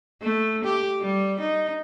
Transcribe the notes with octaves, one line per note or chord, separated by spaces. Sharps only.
A3
G4
G3
D#4